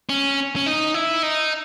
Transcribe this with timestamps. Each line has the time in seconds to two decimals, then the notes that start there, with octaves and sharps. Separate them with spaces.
0.09 C#4
0.56 C#4
0.66 D#4
0.94 E4
1.23 D#4